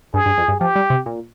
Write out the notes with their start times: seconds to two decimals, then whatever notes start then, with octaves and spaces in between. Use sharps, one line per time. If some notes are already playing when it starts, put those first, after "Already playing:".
0.14 G2 G#4
0.26 G2
0.38 F2
0.48 G2
0.60 F3 G4
0.76 G3
0.90 C3
1.06 A#2